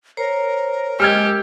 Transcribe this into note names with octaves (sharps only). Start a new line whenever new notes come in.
A#4 C5 C#5 A#5
G#3 G4 D#5 E6 F6 G#6